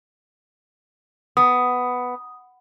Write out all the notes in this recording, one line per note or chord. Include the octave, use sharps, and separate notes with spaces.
B3 D#6